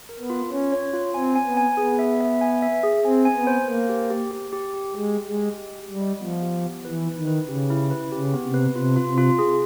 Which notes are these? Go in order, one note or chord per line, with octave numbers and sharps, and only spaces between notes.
A#4
B3
F4
C#4 F4
C#5
F4
C4 G#5
G#5
B3
G#5
B3 G#4
E5
E5
G#5
E5
G#4
C4 G#5
G#5
B3
C5
A#3 C5
G4
G4
G4
G4
G4
G#3 G4
G4
G#3
D#5
G4
G4
G3
D#5
F3 B3
G4
B3
E3 B4
E4
D#3
B4
C#3 G4
E4
B4
C#3 G4
B3
C3
B4
C3 F4
F4
C3
F4
G#4